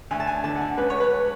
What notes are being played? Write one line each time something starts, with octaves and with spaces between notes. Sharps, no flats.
D2 G#5
A5
G#5
D3 A5
F#5
G#5
C#2 B4
C#5
B4